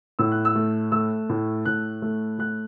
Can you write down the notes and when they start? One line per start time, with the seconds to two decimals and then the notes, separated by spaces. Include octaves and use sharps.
0.19 A2 E6
0.32 F#6
0.45 E6
0.55 A3
0.92 A3 E6
1.29 A2
1.65 A2 F#6
2.02 A3
2.39 A3 F#6